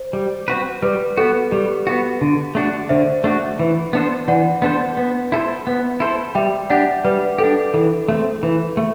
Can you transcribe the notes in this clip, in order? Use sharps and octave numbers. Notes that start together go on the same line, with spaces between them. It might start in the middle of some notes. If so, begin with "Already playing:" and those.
Already playing: C5
G3
C4 F#4 B4
G3 B4
B3 F#4 A4
G3 G4
B3 F#4
D3
A3 D4 F#4
D3 C5 E5
A3 D4 F#4
E3
B3 D4 A4 C5
E3 D5 F#5
B3 D4 A4 C5
B3
E4 A4 C5
B3
E4 A4 C5
G3 E5 G5
D4 G4 D5 F#5
G3 B4 D5
D4 G4 A4
E3 A4
A3 C4
E3
A3